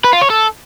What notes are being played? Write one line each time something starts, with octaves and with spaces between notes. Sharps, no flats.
B4
F4
C#5
A4